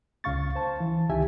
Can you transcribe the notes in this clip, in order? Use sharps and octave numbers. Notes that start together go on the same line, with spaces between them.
C#2 C#3 F5 C#6 A6
C5 A5
E3
C#2 D#3 G4 E5 G#5